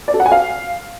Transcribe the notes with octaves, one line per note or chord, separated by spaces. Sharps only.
D5
A4
F#5
G#5
F5